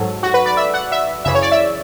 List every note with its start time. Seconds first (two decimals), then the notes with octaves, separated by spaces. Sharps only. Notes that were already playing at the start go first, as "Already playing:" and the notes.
Already playing: G#2 F#3 A4
0.23 F#4
0.34 B4
0.46 D5
0.57 E5
0.74 F#5
0.92 E5
1.25 F#2 C#3 E3 E5
1.35 C#5
1.42 D5
1.52 E5